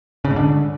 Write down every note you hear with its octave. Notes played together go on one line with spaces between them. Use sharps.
C#3
G#2
D3